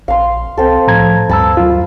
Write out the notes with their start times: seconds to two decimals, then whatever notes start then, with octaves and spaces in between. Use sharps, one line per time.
0.08 A#1 F5 C6
0.57 C2 C4 A4
0.87 A2 F3 A#5 G#6
1.29 D2 G2 A5 B5 E6
1.57 F#2 F4